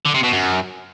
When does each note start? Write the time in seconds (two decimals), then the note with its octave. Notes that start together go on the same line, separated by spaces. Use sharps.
0.06 D3
0.15 C3
0.24 B2
0.32 F#2